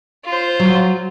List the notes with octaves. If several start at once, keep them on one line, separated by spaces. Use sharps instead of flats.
F4 C5
F#3